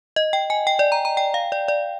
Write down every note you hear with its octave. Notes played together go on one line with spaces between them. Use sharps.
D#5
G5
G#5
G5
D5
A#5
A#5
G5
F5
D5
D5